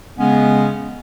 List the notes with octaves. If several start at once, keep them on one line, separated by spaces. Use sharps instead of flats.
C#3 G#3 B3 C#4